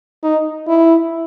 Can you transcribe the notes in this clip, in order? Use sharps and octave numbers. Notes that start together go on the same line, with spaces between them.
D#4
E4